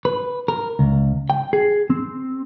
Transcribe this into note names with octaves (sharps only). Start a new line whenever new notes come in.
B4
A#4
C#2
G5
G#4
C4